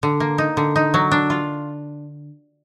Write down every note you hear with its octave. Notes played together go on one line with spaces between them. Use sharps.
D3
A#3
D#4
D3
D#4
F#3
D4
F4